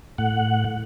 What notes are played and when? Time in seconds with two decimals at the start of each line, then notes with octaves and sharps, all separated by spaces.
0.18 A2 F#5